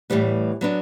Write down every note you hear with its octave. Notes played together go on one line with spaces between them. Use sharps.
A2 E3 G3 B3
F#3 B3 D4